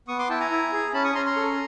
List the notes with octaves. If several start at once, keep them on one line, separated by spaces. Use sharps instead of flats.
B3 C#6 D#6
C6 D6
E4 G5 A5
G#5 A#5
E4
G#4
C#4 A5 B5
C#6 D#6
C#4 A#5 C6
A#5 C6
A4